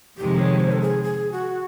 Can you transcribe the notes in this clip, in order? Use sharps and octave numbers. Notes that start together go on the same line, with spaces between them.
F2 C3 D#3 G#3 G4
C#5
C5
A4
G#4
G#4
F#4